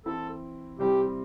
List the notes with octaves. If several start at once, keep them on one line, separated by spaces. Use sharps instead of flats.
E3 C4 E4 A4
C3 G3 C4 E4 G4